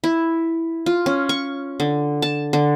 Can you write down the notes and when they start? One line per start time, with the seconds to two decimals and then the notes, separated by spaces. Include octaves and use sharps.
0.04 E4
0.86 F4
1.06 C#4
1.29 C#6
1.80 D3
2.22 A5
2.53 D3